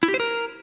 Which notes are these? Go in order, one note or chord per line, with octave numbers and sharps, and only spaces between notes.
E4
G4
C5
A#4